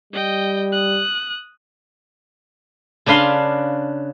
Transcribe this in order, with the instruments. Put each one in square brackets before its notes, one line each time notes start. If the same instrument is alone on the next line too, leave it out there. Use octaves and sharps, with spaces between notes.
[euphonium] G3 [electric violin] D#5 G5
[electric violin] D#6 F#6
[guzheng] C#3 D4 B4 F5 C6